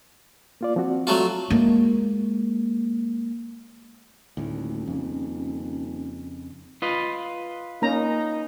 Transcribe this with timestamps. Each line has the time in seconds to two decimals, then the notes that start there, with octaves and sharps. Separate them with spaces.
0.61 A#3 F4 D5
0.76 F3 C4 F#4
1.07 F#3 A3 F4
1.50 G#3 A#3
4.37 D#1 D2 A2
4.87 F2 C#3
6.82 F4 B4 D#5
7.82 A#3 C#4 D#4 A#5